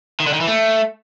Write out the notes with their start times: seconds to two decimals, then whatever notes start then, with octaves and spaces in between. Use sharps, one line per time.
0.20 D#3
0.27 D3
0.34 D#3
0.40 E3
0.47 A3